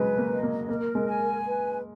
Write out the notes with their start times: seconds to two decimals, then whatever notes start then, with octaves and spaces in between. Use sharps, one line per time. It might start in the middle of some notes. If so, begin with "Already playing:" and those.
Already playing: C#3 F#3 G#3 B4
0.18 A#3
0.31 D#5
0.43 A#3
0.69 A#3 A#4
0.95 G#3
1.07 G#5
1.46 B4